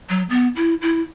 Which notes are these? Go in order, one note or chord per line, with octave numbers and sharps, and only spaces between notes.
F#3
B3
E4
E4